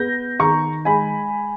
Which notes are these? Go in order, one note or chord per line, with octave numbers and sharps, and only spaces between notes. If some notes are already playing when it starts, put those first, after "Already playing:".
Already playing: B3 G6 A#6
D#3 A#5 C#6
G#3 G#5 B5